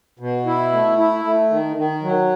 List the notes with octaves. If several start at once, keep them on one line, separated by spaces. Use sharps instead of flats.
B2
E4
A3
E4
A3
D#3
D#3
F#3